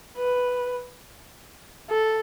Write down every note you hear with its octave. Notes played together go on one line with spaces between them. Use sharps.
B4
A4